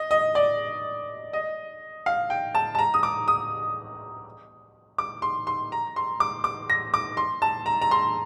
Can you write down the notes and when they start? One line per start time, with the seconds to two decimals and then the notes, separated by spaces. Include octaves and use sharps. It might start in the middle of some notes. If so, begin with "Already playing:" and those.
Already playing: D#5
0.11 D#5
0.35 D5
1.33 D#5
2.06 F5
2.30 G5
2.55 A5
2.75 A5
2.79 A#5
2.94 D#6
3.03 D6
3.28 D#6
4.98 D6
5.22 C6
5.47 C6
5.72 A#5
5.96 C6
6.20 D6
6.44 D6
6.70 A#6
6.94 D6
7.17 C6
7.42 A5
7.66 A#5
7.82 A#5
7.91 C6